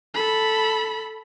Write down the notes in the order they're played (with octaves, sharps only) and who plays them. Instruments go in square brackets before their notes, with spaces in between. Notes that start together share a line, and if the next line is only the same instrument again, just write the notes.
[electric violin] A4 B5